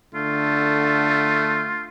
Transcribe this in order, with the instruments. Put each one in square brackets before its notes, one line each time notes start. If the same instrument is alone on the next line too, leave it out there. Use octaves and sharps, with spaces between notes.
[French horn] D3 [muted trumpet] A3 [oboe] F4